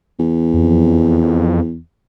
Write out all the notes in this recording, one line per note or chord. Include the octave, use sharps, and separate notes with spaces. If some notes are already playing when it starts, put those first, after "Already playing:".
E2
F2